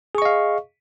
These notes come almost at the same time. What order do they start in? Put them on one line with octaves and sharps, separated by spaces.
G#4 C#6 D#5 F5